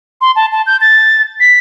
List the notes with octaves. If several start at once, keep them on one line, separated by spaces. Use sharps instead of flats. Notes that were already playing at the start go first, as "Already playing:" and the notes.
C6
A5
A5
G6
A6
B6